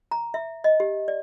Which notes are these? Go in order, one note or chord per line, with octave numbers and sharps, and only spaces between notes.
A#5
E5
D#5
G4
D5